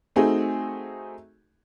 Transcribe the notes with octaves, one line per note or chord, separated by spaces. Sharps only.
A3 C4 D#4 F#4 G#4